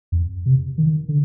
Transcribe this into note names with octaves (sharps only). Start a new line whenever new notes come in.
F2
C3
D#3
D3